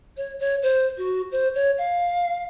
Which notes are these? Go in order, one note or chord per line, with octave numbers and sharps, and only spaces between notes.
C#5
C#5
C5
F#4
C5
C#5
F5